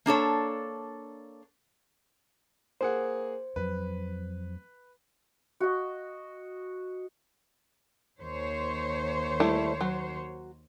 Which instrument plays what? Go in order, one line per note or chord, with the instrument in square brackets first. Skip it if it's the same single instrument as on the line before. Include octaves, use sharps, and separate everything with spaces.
[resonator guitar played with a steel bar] A#3 D4 A4 C#5
[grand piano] A#3 G#4 F#5 [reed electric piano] C5
[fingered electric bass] F2 F#3 [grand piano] B4
[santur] F#4 D#5
[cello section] D#2 C5 C#5
[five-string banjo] G3 A3 E4
F#3